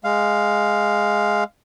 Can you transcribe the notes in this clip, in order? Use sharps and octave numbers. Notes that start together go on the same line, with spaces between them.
G#3 F5